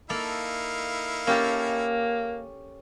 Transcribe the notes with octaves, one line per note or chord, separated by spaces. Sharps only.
A#3 D#4 E4 A4 F5
A#3 C#4 G4 A4